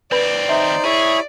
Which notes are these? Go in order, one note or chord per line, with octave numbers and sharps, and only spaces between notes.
D#2 C4 B4 D5 B5
D#4 C5 E5
E4 G#4 C#5 B5